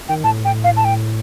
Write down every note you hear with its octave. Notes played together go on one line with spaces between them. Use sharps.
D#3 G5
A2 A5
G5
F5
A5
G5